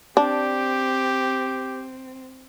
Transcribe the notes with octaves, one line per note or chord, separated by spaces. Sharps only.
C4 D4 G4